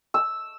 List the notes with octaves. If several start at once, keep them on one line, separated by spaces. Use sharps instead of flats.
E6